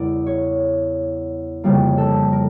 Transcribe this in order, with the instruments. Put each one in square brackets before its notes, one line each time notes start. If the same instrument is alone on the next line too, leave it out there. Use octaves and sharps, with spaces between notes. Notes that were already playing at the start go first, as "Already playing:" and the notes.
Already playing: [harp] E2 C#3 G3 A#4 D5
C#5
F2 C#3 G3 A#3
A4
A#4